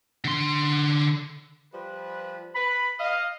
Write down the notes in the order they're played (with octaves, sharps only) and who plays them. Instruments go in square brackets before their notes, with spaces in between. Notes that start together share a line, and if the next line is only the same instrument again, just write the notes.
[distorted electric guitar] D3 C6
[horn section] F3 G3 B4
[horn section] B4 [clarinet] B5
[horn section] D#5 [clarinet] F5